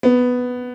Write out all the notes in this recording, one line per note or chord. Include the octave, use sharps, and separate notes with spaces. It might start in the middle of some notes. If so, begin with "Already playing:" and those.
B3